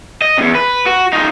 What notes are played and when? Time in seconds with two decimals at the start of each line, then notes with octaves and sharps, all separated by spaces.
0.22 D#5
0.38 E2 C3
0.55 B4
0.86 F#4
1.13 D#4 F4